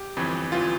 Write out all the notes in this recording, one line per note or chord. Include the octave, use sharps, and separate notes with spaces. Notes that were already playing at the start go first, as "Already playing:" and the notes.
Already playing: G4
G1 F2 E3
G1 E3 F4